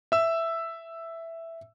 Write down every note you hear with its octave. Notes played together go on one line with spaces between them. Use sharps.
E5 E6